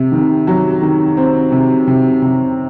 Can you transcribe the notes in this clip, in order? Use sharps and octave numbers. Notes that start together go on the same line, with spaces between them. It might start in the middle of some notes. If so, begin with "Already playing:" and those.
Already playing: C3
D#3
F#3
D#3
C4
C3
C3
C3